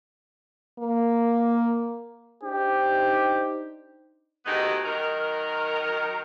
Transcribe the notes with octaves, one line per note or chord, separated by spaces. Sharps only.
A#3
D4 D#4 G4 C5
D2 D#3 G#3 B3 D#4 G4
D#3 F#3 D#4 A#4